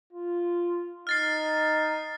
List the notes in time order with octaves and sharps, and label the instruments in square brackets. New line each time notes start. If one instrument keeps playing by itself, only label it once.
[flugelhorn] F4
[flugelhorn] D#4 [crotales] F6 A6 C7